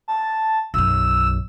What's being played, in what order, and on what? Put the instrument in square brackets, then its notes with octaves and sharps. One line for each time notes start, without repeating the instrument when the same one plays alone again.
[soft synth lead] A5
[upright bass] B1 F#2 [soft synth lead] E6